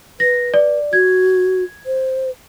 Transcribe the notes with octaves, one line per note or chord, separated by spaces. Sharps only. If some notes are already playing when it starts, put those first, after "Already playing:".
B4 A#6
D5
F#4 G#6
C5